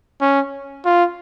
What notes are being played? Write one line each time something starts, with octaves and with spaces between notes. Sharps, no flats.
C#4
F4